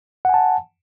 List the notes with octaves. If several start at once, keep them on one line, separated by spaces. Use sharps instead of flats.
F#5 G#5 A5